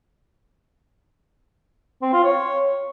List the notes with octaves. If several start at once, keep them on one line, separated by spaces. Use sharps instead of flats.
C4
F4
C#5